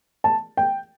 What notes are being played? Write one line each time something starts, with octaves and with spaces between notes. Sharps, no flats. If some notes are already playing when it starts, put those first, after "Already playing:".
A5
G5